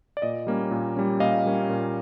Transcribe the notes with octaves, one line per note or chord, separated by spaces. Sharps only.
D5
A#2 D#5
G3 A#3 C#4
A#2
G3 A#3 C#4
A#2 D#5 F5
G3 A#3 C#4
A#2